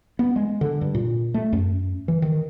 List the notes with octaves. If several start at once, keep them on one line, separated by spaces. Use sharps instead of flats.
B3
G#3
D3
G2
A#2
A3
F#2
E3
D#3